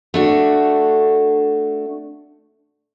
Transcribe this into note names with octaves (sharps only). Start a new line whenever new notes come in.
A3 D4 F#4